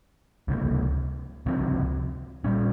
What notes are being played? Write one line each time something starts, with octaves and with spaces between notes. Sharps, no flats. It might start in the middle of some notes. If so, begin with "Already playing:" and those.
C#2 C3 D#3 A#3
C#2 C3 F3 C4
A#2 G3 C#4